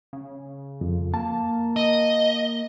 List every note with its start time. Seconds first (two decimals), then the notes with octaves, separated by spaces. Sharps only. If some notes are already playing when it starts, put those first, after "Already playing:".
0.13 C#3
0.81 F2
1.14 A#3 A5
1.76 D#5